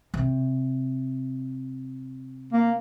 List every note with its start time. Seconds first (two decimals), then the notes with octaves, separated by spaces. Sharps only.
0.14 C3
2.53 A#3